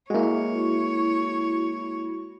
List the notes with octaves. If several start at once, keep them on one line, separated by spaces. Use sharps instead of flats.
G#3 A#3 E4 F#4 C#5